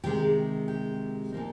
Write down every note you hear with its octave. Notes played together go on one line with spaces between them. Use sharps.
C3 D#3 G#3 G4
G4
A#2 F3 A#3 D#4